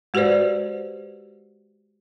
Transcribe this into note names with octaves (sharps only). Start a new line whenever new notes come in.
G#3 F#4 G4 B4 C5 D5